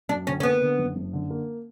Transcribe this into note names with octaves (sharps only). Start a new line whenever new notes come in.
F#2 D4
D3 C#4
C#4
A#3 B3
D3
F#1
F#1
D3
A#3